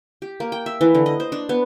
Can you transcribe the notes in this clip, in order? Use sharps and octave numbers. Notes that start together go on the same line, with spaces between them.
G4
A#3
G5
E5
E3
D3
D#5
C5
D4
B3